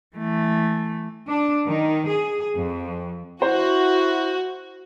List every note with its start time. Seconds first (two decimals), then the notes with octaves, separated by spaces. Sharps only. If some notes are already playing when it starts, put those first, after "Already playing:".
0.17 E3 A3
1.29 D4
1.67 D#3
2.09 G#4
2.57 F2
3.42 E4 F#4 C5